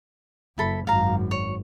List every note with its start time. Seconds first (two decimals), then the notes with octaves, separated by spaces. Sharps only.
0.58 F#1 E4 A4 B5
0.87 G#1 F#2 F5 A#5
1.31 C#5